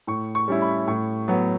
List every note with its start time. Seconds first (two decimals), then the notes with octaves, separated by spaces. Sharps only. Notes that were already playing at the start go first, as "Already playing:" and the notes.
0.07 A2 C#6
0.35 C#6
0.48 G3 C#4 E4
0.62 B5
0.87 A2 C#6
1.28 F#3 B3